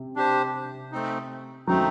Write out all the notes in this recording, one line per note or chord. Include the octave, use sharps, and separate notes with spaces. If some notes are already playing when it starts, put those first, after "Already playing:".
Already playing: C3
D4 G4 C5
A3 C4 D#4
F#3 A3 C4 D#4